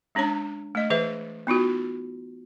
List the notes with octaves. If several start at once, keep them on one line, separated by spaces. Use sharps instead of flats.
G#3 C#4 D4 C#5 A#5
A3 D#5
E3 G#4 B4 E5
B3 D#4 F4 F#4